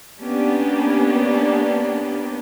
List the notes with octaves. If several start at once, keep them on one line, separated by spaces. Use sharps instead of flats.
A#3 B3 C#4 D4 G4